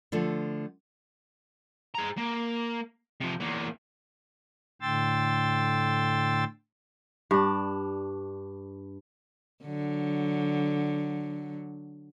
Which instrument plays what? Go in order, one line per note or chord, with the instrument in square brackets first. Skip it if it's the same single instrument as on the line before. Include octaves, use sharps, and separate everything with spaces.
[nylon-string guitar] D3 F3 A3
[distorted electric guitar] G#4 A#5
A#3
C3 F3
E2 A#3
[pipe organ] A2 D3 G5 C6 E6 A6
[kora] G2 D4
[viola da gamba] D3 F#3